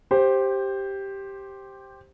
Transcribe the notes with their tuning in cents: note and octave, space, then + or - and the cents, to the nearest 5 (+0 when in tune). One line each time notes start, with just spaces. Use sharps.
G4 +0 C5 +10